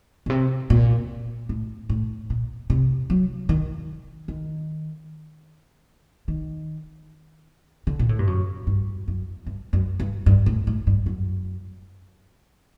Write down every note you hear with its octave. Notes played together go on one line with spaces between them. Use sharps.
A#2
C3
A#2
A2
A2
A#2
C3
F#3
D#3
D#3
D#3
D3
A#2
A2
G2
F#2
G2
F#2
G2
F#2
G2
G2
A2
A2
G2
F#2